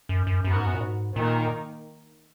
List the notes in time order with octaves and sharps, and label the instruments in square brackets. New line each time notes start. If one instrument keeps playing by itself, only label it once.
[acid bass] F#2
F#2
[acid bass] F#2 [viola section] B3 F#4 A#4
[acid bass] G#2
F#2
A#2
G#2
[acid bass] A#2 [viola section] D#3 A#3 D#4 A#4